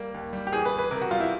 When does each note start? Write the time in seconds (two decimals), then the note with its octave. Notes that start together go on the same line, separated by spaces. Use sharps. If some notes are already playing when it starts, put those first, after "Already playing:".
Already playing: G3 A#3
0.14 D#2
0.33 G3
0.47 G4
0.53 E2 G#4
0.65 B4
0.72 E2
0.79 B4
0.91 C3 A#4
1.01 F#4
1.11 G3 F4
1.20 E4